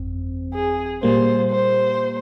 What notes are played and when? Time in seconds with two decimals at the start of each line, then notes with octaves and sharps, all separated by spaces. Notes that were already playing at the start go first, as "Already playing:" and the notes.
Already playing: G1 F2 C4
0.54 G#4
1.02 A#2 G3 A#3 C5
1.51 C5